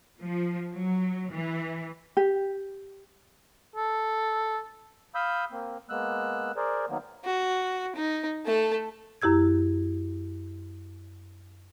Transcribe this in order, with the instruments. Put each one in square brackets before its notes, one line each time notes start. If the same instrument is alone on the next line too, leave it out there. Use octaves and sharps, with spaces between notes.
[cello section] F3
F#3
E3
[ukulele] G4
[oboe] A4
[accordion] F5 B5 D#6 E6 G6
A#3 C4
G#3 A#3 B3 E6 F#6
G#4 A#4 C5 D5
D#3 F#3 A#3 B3
[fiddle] F#4
D#4
A3 A4
[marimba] F#2 E4 G4 E6 G#6